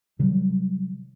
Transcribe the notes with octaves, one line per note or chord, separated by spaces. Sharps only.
C3 D#3 F#3 G3